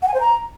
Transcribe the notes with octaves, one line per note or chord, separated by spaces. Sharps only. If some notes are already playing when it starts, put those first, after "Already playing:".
F#5
G#5
C5
A#5